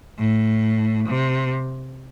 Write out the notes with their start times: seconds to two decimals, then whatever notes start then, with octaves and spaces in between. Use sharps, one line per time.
0.18 A2
1.09 C3